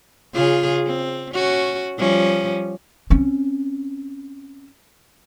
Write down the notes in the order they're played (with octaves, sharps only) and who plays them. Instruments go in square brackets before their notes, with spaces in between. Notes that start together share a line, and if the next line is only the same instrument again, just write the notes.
[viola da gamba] C#3 F4 G#4
C4
C#4 F#4
F3 G3 C#4
[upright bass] C4 C#4